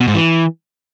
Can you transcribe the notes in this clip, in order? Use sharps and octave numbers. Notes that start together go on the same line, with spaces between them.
B2
G#2
E3